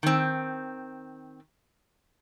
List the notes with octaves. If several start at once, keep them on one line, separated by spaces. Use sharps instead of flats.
D#3 C4